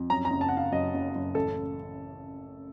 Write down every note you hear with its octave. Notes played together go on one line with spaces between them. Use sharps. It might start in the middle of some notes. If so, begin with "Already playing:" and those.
Already playing: F2
F#2 A#5
A#5
F#1
A5
F#5
F#1 F5
F#2 D#5
F#1
F#1
A1 A4